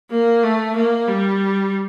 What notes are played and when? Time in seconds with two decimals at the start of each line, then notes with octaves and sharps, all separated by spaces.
0.11 A#3
0.43 A3
0.76 A#3
1.08 G3